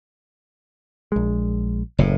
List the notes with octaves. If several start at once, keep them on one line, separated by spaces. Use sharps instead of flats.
A#1 G#3
F#1 A2